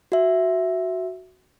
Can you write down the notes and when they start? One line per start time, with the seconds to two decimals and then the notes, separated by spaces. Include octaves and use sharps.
0.12 F#4 E5